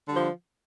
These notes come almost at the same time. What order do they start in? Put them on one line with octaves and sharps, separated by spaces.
D3 G3 F3